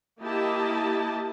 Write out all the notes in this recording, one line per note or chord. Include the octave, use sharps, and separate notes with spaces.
A#3 E4 G4 D#5 A5